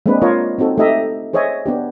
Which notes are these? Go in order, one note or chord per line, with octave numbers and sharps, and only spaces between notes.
G#3 A#3 C4 D4 B4
F4 A#4 C#5 D#5
C4 D#4 F#4 A4
A3 D#4 G4 D#5 E5 A#5
G#4 C5 C#5 D#5 E5 G#5
B3 D4 G4